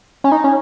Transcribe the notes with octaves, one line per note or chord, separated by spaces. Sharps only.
C#4
D#4
C#4